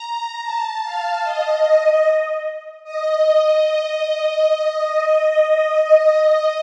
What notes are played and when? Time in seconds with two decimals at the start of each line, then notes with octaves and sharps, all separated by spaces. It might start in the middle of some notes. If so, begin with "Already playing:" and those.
Already playing: A#5
0.43 A5
0.83 F5
1.24 D#5
2.84 D#5